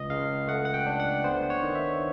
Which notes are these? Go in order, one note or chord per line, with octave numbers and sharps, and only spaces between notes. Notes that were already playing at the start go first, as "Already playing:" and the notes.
Already playing: C#2 D#5
C#2 F5
A3 F#5
F#5
G5
D4
F#5
B3 C5
C#5
D#3
E5